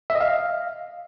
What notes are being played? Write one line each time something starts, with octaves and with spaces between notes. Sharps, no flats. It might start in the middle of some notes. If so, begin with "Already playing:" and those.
E5
D#5
F5